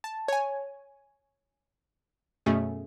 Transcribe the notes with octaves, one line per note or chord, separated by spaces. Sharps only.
A5
C#5 G#5
F#2 B2 A3 C#4 G#4